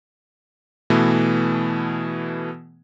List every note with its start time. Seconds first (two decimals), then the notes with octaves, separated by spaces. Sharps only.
0.90 B2 E3 A3 B3